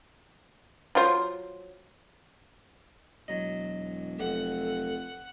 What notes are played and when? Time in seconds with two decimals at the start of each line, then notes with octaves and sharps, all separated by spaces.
0.95 F#3 F4 C5
3.28 E1 F#3 D#5
4.19 F1 A4 F#5